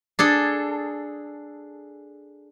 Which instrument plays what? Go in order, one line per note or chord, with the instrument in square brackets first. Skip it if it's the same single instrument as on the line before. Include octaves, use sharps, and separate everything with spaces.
[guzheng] D4 G#4 A4